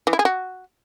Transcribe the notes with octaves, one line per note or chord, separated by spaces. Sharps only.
E3
E4
G#4
F#4